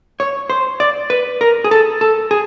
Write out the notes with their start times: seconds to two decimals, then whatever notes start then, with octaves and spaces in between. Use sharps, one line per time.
0.20 C#5
0.50 C5
0.80 D5
1.10 B4
1.41 A#4
1.64 G#4
1.71 A4
2.01 A4
2.31 G#4